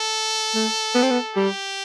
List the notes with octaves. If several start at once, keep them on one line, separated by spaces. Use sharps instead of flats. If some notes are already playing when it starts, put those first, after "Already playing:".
Already playing: A4
A3
B3
C4
B3
G3 G4